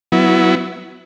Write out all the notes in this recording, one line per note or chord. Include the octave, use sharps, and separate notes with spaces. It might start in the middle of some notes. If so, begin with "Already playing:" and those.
F#3 B3 E4